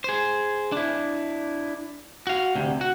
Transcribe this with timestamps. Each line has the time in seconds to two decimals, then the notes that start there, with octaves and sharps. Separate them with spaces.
0.04 G#4 C5
0.72 D4 E4
2.27 F#4 F5
2.55 D2 C3
2.81 F#4